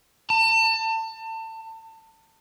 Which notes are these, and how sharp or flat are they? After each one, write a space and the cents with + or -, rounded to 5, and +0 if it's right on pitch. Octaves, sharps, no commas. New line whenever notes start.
A5 +30